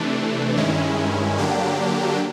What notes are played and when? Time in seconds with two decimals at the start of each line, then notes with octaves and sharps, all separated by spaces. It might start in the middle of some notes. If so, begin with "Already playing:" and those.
Already playing: C3 E3 A3 D4
0.57 G2 D#3 G#3 C#4 E4
1.38 D3 F#3 A#3 D4 G4